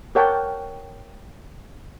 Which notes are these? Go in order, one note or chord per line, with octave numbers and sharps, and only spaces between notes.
G4 A#4 C#5 F#5 G5 A5